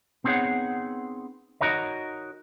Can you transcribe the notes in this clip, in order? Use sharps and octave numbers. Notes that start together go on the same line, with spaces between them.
B3 C4 D#4 G#4 C#5 F#5
D#4 F#4 A#4 C#5 D#5